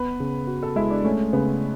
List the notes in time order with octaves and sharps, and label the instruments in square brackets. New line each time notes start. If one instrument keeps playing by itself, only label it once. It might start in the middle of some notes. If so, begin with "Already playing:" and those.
Already playing: [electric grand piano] B3 [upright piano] B4
[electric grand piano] C#3
F#4
[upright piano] A4
[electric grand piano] G#3 [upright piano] E4
[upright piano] D4
[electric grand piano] A3 [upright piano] C#4
[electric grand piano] C#3 [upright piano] B3